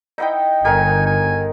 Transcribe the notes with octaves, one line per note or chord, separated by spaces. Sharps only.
D#4 E4 D#5 E5 F#5 G5
G1 D#3 D#4 A4 A#4 G#5
G#5